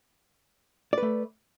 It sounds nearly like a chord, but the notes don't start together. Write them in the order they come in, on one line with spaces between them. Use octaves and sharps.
D5 B4 A3